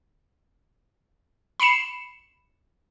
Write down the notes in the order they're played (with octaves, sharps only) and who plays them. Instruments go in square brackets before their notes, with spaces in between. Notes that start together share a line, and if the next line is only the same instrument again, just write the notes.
[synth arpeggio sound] B5 C7 C#7 E7